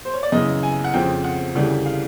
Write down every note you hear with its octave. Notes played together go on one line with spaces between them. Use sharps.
C5
C#5
D5
F#2 C#3 E3 D#5
G#5
F#5
F2 C#3 F3 G5
F#5
D2 C#3 E3 G3
F5